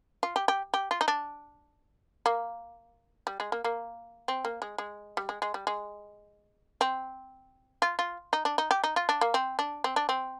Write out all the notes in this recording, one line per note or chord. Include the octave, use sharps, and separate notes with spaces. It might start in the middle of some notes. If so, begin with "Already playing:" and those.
F4
G4
G4
G4
F4
D#4
D4
A#3
G3
G#3
A#3
A#3
C4
A#3
G#3
G#3
G3
G#3
G#3
G3
G#3
C4
F4
F4
D#4
D4
D#4
G4
D#4
F4
D4
A#3
C4
D4
C4
D4
C4